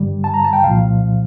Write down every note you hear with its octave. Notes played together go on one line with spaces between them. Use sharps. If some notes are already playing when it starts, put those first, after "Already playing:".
Already playing: G2 D3 G3
A5
A#5
A5
G5
C2 A#2 F3 F5